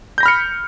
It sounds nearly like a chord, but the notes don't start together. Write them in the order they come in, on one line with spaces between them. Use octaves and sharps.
G6 A#6 B5 F6 C#7